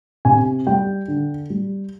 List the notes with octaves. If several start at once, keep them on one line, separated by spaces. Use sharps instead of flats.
C3 G#5
G3 G5
D3
G3